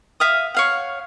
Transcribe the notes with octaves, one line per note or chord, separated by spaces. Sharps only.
E5 F5 D#6
C#5 F5 F#5